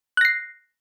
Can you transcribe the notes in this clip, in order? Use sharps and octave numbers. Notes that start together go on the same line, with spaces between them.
F#6 A#6 C7